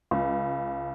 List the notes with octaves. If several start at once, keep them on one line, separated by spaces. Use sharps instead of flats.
C#2